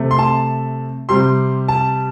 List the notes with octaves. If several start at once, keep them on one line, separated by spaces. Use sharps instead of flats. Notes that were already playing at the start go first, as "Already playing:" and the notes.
Already playing: C3 A3
C6
A5
C3 G3 C6
A5